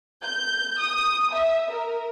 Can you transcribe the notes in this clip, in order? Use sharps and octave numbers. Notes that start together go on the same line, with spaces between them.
G6
D#6
E5
A#4